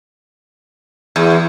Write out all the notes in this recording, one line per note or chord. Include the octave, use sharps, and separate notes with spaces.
E2